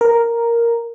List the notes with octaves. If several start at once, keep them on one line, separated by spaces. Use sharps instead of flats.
A#4